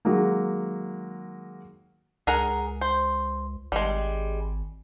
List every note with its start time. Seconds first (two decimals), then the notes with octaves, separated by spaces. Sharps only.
0.05 D#3 F#3 G#3 A#3
2.27 C#2 G#4 A#4 F#5
2.81 C5
3.72 G#1 G3 G#3